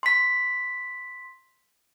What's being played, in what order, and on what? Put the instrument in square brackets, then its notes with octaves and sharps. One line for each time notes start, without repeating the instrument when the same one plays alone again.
[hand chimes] C6 B6